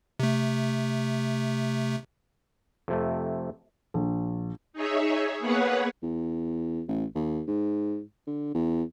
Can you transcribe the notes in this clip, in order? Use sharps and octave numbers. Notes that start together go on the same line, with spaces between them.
C3 A3
F2 C3 A3
A#1
D#4 G#4 C#5 E5
A#3 B3 G#4 B4 C#5 F#5
E2
A1
D#2
G#2
D3
E2